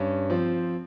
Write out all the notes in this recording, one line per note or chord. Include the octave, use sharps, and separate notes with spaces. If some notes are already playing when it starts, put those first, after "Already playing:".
Already playing: G2 C#4
F3 C4